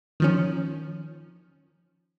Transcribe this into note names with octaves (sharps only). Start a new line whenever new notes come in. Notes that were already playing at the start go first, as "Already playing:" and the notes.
D#3 F3 C#4